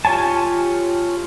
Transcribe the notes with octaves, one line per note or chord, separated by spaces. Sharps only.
F4 G4 C#5 G#5 A5